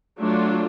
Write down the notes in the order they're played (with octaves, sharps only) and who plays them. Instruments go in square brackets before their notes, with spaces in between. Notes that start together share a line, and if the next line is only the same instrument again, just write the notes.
[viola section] F#3 A3 D4 F4